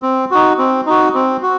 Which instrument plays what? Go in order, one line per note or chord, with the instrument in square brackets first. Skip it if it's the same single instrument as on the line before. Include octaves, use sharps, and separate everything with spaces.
[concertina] C4
D#4 F#4
C4
D#4 F#4
C4
F#4